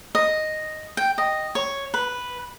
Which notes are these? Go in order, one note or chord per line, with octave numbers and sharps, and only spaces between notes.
D#5
G5
D#5
C#5
B4